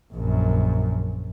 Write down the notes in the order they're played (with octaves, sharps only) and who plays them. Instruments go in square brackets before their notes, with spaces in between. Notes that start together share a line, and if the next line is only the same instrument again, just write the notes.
[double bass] A#1 F#2